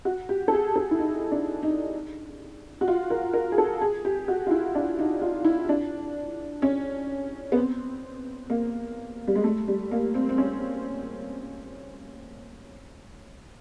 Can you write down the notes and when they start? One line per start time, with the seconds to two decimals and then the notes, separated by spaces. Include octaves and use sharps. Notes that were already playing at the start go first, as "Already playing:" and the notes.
0.05 F#4
0.29 G4
0.48 A4
0.53 G#4
0.76 A4
0.91 E4
0.99 D#4
1.31 D4
1.63 D#4
2.81 F#4
2.88 F4
3.10 A#4
3.33 A#4
3.52 G#4
3.58 A4
3.82 G#4
4.05 G4
4.28 F#4
4.47 F4
4.51 E4
4.75 D4
4.99 D#4
5.22 F4
5.45 E4
5.69 D4
6.62 C#4
7.52 B3
7.56 C4
8.50 A#3
9.27 G3
9.35 G#3
9.44 A3
9.68 G3
9.91 A#3
10.14 C4
10.29 C4
10.38 C#4